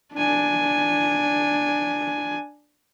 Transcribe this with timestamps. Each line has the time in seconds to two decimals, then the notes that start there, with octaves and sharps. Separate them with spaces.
0.14 D4 G#5